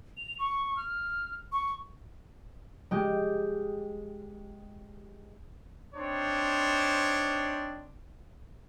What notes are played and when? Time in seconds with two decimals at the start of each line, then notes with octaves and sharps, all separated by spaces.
0.17 F7
0.39 C#6
0.77 F6
1.52 C#6
2.91 G#3 G4
5.94 C4 D4 D#4 C5 C#5